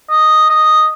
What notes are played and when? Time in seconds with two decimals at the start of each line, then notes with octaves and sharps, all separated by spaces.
0.10 D#5
0.50 D#5